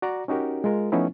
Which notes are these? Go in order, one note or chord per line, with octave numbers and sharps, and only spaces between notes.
F#4 D5 A#5
C#4 D#4 F#4 G4 A#4
G#3 F4 A#4
F3 A3 B3 C#4 D#4 E4